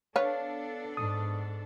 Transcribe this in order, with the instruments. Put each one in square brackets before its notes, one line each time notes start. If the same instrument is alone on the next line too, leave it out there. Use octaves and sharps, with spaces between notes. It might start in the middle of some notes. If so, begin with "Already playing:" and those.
[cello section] B3 D4 A4 [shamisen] B4 C#5 [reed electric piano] F5
[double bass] G#2 [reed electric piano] D#6